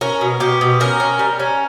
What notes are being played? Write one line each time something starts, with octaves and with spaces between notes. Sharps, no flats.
C#4 A#4
B2
B2 G4
B2
C#4 A#4
C#4
G3
C#4